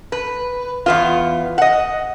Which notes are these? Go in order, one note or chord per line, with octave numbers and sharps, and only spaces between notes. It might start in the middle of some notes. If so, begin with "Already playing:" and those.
B4
E2 B3 F4
D#5 F#5